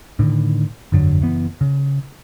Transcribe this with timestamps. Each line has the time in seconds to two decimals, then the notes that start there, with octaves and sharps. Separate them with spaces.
0.19 A2 D3 D#3
0.92 G1 F2 D3 F#3
1.20 F#1 E3 B3
1.61 C#3